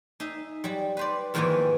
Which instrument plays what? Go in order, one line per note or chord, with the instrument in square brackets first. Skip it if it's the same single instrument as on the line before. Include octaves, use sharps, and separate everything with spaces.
[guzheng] D#4 G#4 E5
F#3 G3
B4 C5 D5
F2 G#2 D#3 E3 A#3 B3